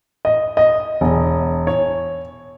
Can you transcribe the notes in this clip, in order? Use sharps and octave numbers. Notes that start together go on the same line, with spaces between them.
D#5
D#5
E1
C#5